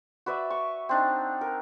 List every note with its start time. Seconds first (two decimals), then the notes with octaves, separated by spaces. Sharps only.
0.26 F#4 B4 D5 E5
0.50 C#6
0.89 C4 D4 D#4
1.41 A#4